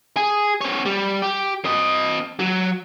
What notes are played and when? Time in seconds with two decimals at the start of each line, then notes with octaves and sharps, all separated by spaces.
0.16 G#4
0.61 C4 C#5
0.86 G3
1.22 G4
1.65 C4 D#5
2.40 F#3